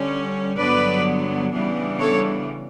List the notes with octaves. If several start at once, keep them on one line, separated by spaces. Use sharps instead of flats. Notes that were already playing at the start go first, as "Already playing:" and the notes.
Already playing: D3 G3 C#4
G2 D3 F#3 B3 D4 B4 D5
C#3 E3 G3 B3 D4
A4 C#5